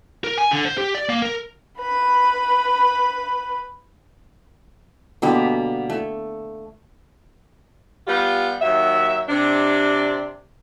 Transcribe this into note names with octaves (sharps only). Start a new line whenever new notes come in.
A#4
G#5
D3
C5
G4
D5
A#3
A#4
B4 B5
B2 D3 G3 A#3
A3
G3 B3 F4 G4
D#2 F#3 E5
C3 D4